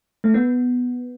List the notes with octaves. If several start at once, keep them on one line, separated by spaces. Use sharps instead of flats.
A3
B3